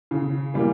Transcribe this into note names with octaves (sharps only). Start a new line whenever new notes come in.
C#3
E3 G3 A#3